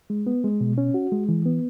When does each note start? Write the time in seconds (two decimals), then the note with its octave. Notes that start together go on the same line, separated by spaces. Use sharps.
0.10 G#3
0.27 B3
0.44 G#3
0.61 B2
0.78 C#4
0.94 F#4
1.12 G#3
1.29 E3
1.45 B3